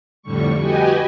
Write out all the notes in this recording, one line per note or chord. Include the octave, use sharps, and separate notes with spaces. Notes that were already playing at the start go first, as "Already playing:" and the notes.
F2 A2 D3 G3 C#6
F#4 G4 B4 D#5 G5 G#5